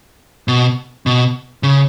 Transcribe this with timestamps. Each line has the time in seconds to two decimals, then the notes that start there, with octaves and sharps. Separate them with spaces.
0.48 B2
1.06 B2
1.63 C#3